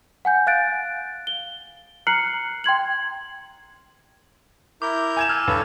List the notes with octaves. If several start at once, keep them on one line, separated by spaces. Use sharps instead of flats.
F#5 G#5 G6
F5 F#6 A6 D7
G7
A#5 F6 F#6 C7 C#7 F#7
G5 C6 G#6 F#7
E4 A#4 D6 G6
G#5 G#6 E7
G#5 A5 E6 F6
G2 A4 B4 C#5